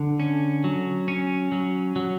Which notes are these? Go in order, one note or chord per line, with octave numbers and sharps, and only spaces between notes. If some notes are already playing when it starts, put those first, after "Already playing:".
Already playing: D3
C#4
F#3
C#4
F#3
F#3